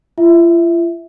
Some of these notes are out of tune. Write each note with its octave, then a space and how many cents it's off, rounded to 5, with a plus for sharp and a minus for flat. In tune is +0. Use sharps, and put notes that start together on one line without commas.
F4 -45 E5 -10